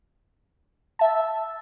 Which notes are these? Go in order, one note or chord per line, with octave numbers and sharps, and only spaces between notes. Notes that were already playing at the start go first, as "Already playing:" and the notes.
E5 A5